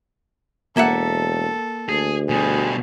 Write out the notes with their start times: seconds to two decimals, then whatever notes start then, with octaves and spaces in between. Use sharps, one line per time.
0.77 E1 A#3 A4 E5 F#5
1.89 D2 G#4
2.29 B2 G3 G#4